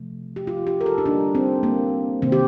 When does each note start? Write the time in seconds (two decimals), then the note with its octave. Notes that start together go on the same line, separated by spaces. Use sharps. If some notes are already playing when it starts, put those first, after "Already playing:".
Already playing: C3 F3 A3
0.36 G4
0.47 F4
0.67 G4
0.81 A#4
0.86 A4
0.98 D#4
1.06 D3 G3 A#3 D4
1.35 C4
1.63 A#3
2.22 C3 D#3 A#3 C4
2.32 G4